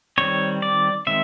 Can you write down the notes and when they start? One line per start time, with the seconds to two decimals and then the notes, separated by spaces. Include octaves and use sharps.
0.18 D#3 G3 C4 C#5
0.62 D5
1.07 D#3 G#3 C4 E5